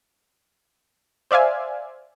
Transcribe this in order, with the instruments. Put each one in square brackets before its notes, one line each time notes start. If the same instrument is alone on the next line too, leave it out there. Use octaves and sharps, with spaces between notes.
[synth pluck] C5 D5 E5 F5 G#5